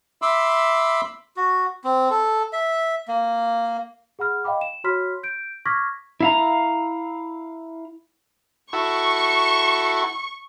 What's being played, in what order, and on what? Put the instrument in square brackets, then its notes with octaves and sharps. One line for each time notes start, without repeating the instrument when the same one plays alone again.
[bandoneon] E5 B5 C6 D6 E6
[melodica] F#4
C4
A4
E5
A#3
[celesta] G#4 F#5 B5 F6
D#5 F5 G5 B5 D6
E7
F#4 C#5 B5 C6 F6 B6
G6 D7
C#6 D6 F6 G#6 A#6 B6
[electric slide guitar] E4 F5 A#5
[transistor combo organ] E4 F#4 A4 [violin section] C#6